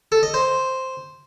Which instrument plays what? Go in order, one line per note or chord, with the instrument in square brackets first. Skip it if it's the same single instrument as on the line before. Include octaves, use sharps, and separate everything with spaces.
[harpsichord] A4
D#5
C5